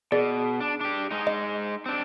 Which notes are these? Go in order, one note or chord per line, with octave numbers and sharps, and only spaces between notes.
B2 G#4 D5
D4
D4 G4
G#3 D#4
D#5
C4 D4